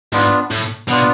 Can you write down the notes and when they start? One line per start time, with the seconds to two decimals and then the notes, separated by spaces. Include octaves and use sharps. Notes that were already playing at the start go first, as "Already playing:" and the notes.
0.13 G#2 B3 D4 F4
0.51 A2
0.88 B2 B3 D4 F4